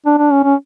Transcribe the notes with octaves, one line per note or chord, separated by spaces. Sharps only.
D4
D4
C#4
C#4